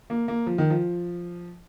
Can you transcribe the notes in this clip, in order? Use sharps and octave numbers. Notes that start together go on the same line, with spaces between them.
A#3
A#3
F3
D#3
F3